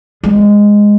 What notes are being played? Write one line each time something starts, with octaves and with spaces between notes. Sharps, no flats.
G#3